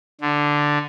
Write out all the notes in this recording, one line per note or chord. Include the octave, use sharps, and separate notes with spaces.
D3